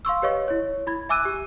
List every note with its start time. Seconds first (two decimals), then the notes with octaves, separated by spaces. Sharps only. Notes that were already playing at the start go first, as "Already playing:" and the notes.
0.05 F5 C6 C#6 E6
0.22 G4 B4 C#5 D#5 F5 C#6
0.48 E4 C#5
0.87 E4 B5 G#6
1.09 E5 G#5 D6 E6 F#6 D#7
1.25 G4